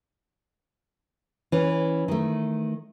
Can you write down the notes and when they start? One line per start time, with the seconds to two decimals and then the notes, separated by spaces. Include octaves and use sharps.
1.52 E3 C#4
2.08 D#3 A3